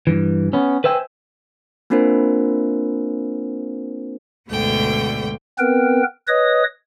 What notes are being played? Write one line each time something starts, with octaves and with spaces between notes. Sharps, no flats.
G2 E3
B3 C#4
B4 C5 E5 G5 G#5
A#3 C4 D4 F4 A#4 C5
D2 G#2 B2 D3 G5
B3 C4 A#4 B4 G5
B4 C#5 D#5 D#6